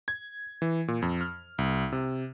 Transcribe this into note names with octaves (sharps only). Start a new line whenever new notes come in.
G#6
E3
A#2
F2
F6
C2
C3